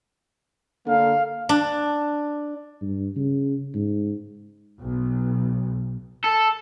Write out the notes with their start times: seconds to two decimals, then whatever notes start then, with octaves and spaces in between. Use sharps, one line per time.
0.86 D3 A#3 F5
1.49 D4
2.81 G2
3.16 C#3
3.75 G#2
4.81 B1
6.24 A4